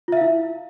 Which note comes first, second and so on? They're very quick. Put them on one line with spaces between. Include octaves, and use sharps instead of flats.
F4 E5 F5 E4